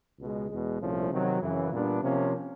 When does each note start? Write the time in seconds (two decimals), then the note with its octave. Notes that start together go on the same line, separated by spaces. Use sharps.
0.19 C#2 B2 G#3
0.49 E2 B2 G#3
0.80 C2 A#2 F3 A3 C#4
1.10 C3 D#3 F#3
1.41 F#2 C#3 E3
1.72 A#2 G3 B3 D4
2.03 C3 F3 A#3 C#4